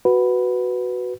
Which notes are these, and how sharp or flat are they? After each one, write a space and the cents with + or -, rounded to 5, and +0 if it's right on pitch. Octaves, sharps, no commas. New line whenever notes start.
F#4 +0 B4 +0